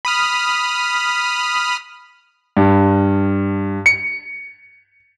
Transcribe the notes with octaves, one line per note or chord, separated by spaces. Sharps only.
B5 D#6 F6
G2
C#7